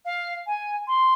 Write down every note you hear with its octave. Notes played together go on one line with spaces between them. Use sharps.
F5
G#5
C6